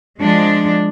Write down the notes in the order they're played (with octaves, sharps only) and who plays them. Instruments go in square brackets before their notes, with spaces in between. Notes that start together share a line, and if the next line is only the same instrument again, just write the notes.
[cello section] F3 G#3 D4